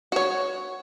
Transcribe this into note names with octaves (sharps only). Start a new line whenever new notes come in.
F#4 C#5